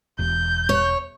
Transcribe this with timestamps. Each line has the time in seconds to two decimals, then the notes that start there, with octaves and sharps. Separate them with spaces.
0.19 E1 G6
0.69 C#5